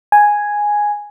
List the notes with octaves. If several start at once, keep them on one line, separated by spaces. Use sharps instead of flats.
G#5